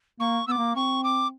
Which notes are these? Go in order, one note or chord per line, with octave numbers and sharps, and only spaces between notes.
A#3 C#6
B3 D6 E6
A#3
C4 C#6
D6